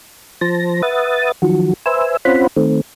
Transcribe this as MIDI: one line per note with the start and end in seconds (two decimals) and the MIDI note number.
0.41 0.82 53
0.41 0.82 72
0.41 0.82 81
0.41 0.82 94
0.82 1.32 71
0.82 1.32 76
0.82 1.32 78
0.82 1.32 87
0.82 1.32 93
1.42 1.73 51
1.42 1.73 53
1.42 1.73 54
1.42 1.73 66
1.86 2.17 71
1.86 2.17 72
1.86 2.17 76
1.86 2.17 80
1.86 2.17 88
2.25 2.47 60
2.25 2.47 61
2.25 2.47 65
2.25 2.47 72
2.25 2.47 78
2.25 2.47 83
2.56 2.81 51
2.56 2.81 57
2.56 2.81 60